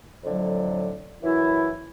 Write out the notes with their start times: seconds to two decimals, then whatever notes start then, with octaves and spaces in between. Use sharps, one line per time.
0.24 F2 A2 D3 F#3
1.23 F#2 E3 F#3 E4